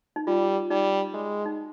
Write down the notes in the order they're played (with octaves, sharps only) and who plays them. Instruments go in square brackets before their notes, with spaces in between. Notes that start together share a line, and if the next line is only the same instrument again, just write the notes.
[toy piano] D#4
[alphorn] G3 [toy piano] F4
[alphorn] G3 [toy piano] D#4
[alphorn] G#3
[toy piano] D#4